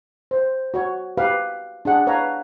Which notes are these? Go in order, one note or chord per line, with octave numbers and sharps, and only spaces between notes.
C5
F#4 C#5
G4 B4 F5
D4 G#4 F#5
B4 C#5 F5 A#5